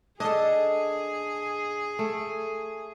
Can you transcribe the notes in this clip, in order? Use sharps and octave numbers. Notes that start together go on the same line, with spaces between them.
D4 G#4 A4 D#5
A3